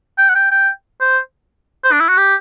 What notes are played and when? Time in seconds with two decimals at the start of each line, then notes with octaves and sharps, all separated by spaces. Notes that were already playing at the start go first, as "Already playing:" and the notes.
0.18 G5
0.29 F#5
0.35 G5
0.51 G5
1.01 C5
1.84 C5
1.92 D4
2.00 E4
2.09 F#4
2.17 G4